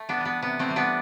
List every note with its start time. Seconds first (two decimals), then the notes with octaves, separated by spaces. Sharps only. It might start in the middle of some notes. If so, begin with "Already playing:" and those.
Already playing: A3
0.09 B3 D4
0.18 E3 G3
0.25 B3
0.42 C3 B3
0.59 A3 C4
0.68 E3 G3
0.76 B3 D4